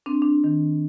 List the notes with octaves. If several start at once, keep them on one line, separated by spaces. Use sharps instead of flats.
C4 D4
D4
D#3